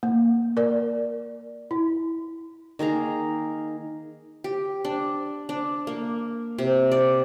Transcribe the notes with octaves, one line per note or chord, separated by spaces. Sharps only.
A#3
A#4 D5
E4
D#3 A#3 G#4 A#5
G4
D4
D4
A#3
C3
D5